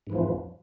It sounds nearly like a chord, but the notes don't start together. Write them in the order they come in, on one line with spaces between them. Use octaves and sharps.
G#2 E3 F3 F2